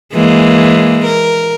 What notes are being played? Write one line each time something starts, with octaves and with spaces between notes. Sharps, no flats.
E3 G#3 A#3
A#4